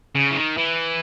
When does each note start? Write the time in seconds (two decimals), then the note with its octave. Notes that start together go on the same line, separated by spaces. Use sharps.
0.15 C#3
0.31 E3
0.36 D#3
0.57 E3